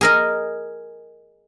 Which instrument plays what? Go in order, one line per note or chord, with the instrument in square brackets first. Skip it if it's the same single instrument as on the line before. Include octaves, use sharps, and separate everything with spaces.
[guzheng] G#4 A#4 D#5